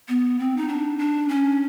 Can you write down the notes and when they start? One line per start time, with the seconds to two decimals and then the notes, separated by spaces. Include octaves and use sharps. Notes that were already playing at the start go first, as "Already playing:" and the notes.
0.08 B3
0.39 C4
0.57 D#4
0.68 D4
0.98 D4
1.28 C#4